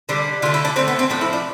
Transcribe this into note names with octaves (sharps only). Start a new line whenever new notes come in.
D3 G3 D4
D3 A3 F4
E4
D4
D3 A3 C4
B3
C4
A2 F3 A3 D4
E4
D4